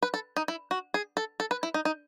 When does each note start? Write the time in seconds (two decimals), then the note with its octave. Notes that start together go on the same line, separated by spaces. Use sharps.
0.02 B4
0.14 A4
0.36 D#4
0.48 E4
0.71 F#4
0.94 G#4
1.17 A4
1.40 A4
1.51 B4
1.63 E4
1.74 D#4
1.85 D#4